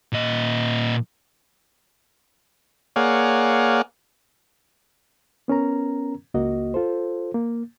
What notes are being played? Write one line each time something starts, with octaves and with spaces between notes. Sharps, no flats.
A#2 D#5
A#3 G#4 C#5 D5 F5 F#5
B3 C#4 A#4 A#5
C#2 A#3 F#4 D#5
F4 A4 C5
A#3